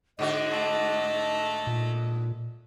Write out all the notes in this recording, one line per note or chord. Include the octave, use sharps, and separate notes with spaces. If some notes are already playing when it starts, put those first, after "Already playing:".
G#2 D3 F#4 D#5
A3 A4
A#2